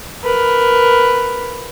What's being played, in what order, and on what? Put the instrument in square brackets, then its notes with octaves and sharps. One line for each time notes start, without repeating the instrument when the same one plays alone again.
[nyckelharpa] A#4 B4